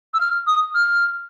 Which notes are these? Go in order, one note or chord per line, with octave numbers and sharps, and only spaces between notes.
E6
F6
D#6
F6